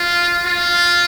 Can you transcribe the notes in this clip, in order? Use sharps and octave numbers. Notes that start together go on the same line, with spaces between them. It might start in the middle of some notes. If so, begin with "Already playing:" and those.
Already playing: F4
F4